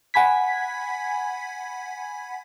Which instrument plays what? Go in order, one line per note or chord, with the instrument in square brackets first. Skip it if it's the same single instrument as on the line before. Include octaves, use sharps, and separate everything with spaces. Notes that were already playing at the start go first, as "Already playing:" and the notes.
[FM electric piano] F#5 G#5 B5 G#6 B6